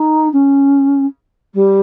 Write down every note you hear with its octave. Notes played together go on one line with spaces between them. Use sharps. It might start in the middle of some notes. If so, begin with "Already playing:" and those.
Already playing: D#4
C#4
G3